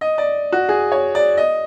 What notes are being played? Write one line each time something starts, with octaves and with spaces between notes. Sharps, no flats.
D#5
D5
F#4
G#4
C#5
D5
D#5